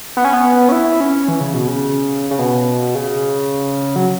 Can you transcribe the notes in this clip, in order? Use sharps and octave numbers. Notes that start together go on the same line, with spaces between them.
B3
C#4
B3
C#4
E4
C#4
E3
C#3
B2
C#3
C#3
B2
C#3
F#3